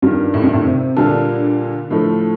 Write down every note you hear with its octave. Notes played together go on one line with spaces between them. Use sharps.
G2 D#3 G3 D4 F4 A#4
A2
G2
A2
C3
A#2 D3 G3 A#3 F4 A4
A2 F3 A3